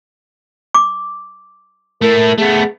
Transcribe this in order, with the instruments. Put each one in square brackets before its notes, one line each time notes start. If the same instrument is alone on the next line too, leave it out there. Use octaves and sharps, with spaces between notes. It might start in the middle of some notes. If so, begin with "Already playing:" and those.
[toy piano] D6
[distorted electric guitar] A3 E4 [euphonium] A#4
[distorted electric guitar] A3 B3 [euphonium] G#4